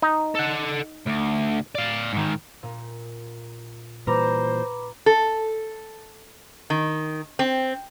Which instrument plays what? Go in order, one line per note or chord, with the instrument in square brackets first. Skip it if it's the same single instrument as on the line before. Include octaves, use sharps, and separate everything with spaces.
[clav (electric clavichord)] D#4
[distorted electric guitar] A4 F#5
D2
D5 F5
G#2 D#3
[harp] A#2
[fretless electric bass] A#2 E3 G3 [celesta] B4 B5 D6 [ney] C5 [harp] A#5
[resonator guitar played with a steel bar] A4
D#3
C4